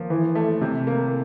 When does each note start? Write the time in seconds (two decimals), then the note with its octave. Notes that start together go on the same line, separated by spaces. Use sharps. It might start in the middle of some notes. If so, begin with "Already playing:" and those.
Already playing: F3 A#3
0.10 E3
0.35 A3
0.61 C3
0.87 A#3